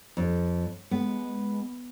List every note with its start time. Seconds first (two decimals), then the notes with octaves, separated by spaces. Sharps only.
0.17 F2
0.91 G#3 B3